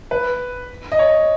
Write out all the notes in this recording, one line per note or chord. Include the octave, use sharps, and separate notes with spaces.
B4
D#5
C#5